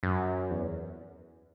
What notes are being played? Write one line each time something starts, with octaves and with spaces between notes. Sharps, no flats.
F#2
E2